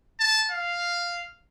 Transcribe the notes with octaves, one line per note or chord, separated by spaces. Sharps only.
A5
F5